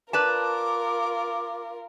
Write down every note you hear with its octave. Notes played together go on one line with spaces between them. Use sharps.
F4 A#4 B4 D5 A5 D6